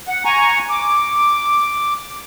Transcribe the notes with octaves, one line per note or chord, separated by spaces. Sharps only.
F#5
G#5 A#5 C#6
D6